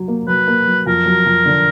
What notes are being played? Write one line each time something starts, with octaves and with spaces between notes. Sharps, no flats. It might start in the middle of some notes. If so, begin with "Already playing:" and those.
Already playing: F#3
A#3
F#3 B4
A#3
F#3
F2 A#4
F#3
F2
D3